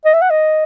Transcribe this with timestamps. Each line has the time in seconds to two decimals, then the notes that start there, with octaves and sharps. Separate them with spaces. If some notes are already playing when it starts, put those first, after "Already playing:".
0.05 D#5
0.14 E5
0.21 F#5
0.30 D#5